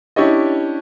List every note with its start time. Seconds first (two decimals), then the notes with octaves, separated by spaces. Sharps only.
0.16 C#4 D4 E4 G4 C#5 D#5